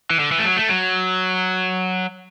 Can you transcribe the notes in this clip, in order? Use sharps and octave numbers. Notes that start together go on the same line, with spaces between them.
E3
D3
E3
A3
F#3
A3
F#3